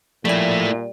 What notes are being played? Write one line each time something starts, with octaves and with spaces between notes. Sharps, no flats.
A#2 F3 G3 A3 E4 G#5